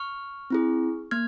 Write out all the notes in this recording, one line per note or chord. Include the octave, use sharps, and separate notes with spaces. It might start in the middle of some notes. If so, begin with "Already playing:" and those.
Already playing: C#6 F6
C4 E4 G#4
A#3 F6 G#6